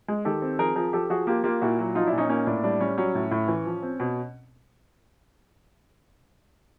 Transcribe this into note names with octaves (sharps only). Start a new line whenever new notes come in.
G#3
D#3 G4 A4
C4
F3 G#4 A#4
F3 G#4 A#4
F3 G4 A4
F3 F#4 G#4
A#3 F4 G4
A#3 F4 G4
A#2 E4 F#4
F#3
F3 D#4 F4
D4 E4
A#2
C#4 D#4
A#3 C#4 D#4
A2 D4
G3 D4
G3 C#4
F#3 C#4
A2
A2
E3
F3
C4
B2